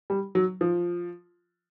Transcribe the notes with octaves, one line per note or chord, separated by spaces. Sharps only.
G3
F#3
F3